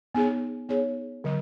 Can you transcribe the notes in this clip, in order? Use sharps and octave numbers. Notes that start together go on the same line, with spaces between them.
B3 D#4 G#4 C#5
B3 D#4 G#4 C#5
D3 F#3